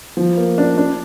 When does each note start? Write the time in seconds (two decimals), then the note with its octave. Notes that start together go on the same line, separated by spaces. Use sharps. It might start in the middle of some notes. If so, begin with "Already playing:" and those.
0.17 F3
0.37 A#3
0.58 D4
0.78 D4